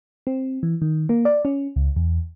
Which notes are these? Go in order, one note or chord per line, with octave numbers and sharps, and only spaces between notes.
C4
E3
D#3
A#3
D5
C#4
C#2
E2